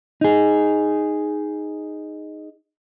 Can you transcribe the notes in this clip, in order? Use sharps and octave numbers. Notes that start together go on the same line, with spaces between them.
D#4 G#4